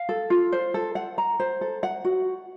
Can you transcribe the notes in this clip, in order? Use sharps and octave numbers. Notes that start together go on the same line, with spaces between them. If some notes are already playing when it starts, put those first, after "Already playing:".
Already playing: F5
A4
F4
C5
A4
F#5
A#5
C5
A4
F#5
F#4